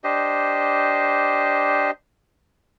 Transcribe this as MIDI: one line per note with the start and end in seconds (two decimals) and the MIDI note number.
0.04 1.91 62
0.04 1.91 67
0.04 1.91 72
0.04 1.91 75